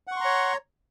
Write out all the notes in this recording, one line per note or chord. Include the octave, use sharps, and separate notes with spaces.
C#5 F#5 A#5 C6 C#6